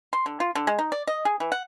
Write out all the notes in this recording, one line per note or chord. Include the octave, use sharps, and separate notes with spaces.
C6
D3
F4
D3
G#3
D#4
D5
D#5
G#4
E3
F#5